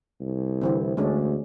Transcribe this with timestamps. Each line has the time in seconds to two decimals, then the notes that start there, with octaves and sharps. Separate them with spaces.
0.21 C2
0.62 D3 E3 C4
0.97 D2 G#3 C#4 D4